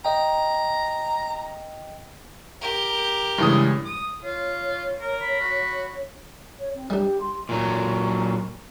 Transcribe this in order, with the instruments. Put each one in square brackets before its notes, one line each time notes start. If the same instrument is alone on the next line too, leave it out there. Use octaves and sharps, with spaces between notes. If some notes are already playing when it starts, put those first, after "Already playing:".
[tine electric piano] D#5 G5 [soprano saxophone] A#5
[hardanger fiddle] G4 A#4
[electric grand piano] G2 E3 D#6 [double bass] C#3 G#3
[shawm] D#6
[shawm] F4 [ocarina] C#5
[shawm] A#4
[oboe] B5
[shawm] F#4
[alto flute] C#5
C4
[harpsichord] G3 D4 [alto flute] G4
[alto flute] C6
[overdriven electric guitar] A#2 F#3